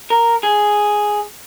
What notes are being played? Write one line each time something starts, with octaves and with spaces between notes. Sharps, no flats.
A#4
G#4